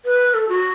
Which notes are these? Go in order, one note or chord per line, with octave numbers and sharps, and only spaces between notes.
B4
A4
F#4